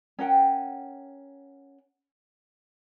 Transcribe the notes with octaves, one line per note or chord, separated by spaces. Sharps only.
C#4 A#4 F#5 G5